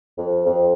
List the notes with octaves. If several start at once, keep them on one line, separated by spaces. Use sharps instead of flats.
F2
F2